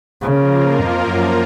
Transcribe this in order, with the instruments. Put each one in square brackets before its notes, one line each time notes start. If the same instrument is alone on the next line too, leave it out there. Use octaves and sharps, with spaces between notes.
[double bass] C#3 [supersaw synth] F3 A#3 F4 A#4
[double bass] F2
F#2